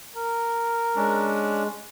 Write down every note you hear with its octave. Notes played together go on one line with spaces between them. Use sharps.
A#4
G#3 C#4 D4